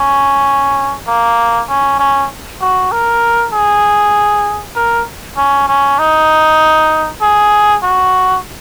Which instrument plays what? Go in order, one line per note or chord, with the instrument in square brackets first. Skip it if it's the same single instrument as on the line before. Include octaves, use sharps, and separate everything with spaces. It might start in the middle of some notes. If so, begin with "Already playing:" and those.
Already playing: [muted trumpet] C#4
A#3
C#4
C#4
F#4
A#4
G#4
A#4
C#4
C#4
D#4
G#4
F#4